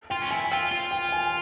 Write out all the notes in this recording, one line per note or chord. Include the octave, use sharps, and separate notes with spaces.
F4 G5
C#4
E4 G#5
F4 G5
F4
G5
G#5